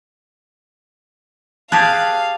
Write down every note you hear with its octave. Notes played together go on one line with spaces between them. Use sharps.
G4 G#4 F5 A5 F#6